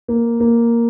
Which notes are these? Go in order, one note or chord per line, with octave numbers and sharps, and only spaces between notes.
A#3
A#3